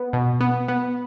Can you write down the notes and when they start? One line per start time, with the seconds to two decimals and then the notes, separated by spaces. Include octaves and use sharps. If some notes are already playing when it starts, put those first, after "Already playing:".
Already playing: B3
0.13 B2
0.41 B3
0.68 B3